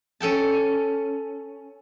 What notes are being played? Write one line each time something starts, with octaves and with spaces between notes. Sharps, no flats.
C#4 A4 G5 A5